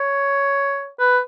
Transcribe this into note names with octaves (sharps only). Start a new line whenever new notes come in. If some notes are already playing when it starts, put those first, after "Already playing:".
Already playing: C#5
B4